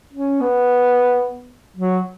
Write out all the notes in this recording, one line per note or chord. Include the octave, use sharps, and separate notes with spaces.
C#4
B3
F#3